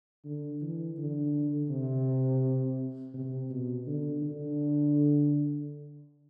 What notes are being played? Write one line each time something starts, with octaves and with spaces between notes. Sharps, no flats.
D3
E3
D3
C3
C3
B2
D3
D3